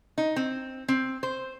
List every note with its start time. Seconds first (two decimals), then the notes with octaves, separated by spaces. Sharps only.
0.18 D#4
0.36 C4
0.88 C4
1.23 C5